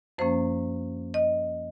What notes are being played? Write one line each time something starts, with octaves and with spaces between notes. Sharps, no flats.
F#2 F3 A#3 C#4 C5
D#5